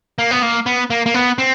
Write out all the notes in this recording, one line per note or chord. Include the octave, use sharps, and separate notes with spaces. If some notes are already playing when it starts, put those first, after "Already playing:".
A#3
B3
A#3
B3
A#3
A#3
B3
C4